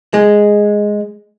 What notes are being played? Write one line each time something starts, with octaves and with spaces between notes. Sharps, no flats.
G#3